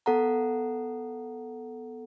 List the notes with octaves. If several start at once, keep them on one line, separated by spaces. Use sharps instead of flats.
B3 A4 F#5 A#5